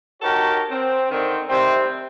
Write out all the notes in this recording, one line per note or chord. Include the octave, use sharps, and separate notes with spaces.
D#4 F#4 G4 A4 A#4 C#5
C4
D3 D#3 C4
C3 D#3 G3 A3 C4